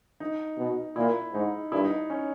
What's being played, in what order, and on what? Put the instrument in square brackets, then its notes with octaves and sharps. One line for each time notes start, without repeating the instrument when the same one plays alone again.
[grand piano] D#4
[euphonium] B2
[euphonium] A#2 [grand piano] E4
[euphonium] G#2 [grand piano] D#4
[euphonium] G2 [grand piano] E4
[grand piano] D#4
C#4